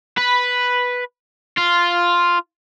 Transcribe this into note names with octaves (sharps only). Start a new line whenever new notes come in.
B4
F4